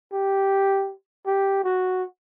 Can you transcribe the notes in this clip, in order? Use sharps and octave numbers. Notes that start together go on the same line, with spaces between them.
G4
G4
F#4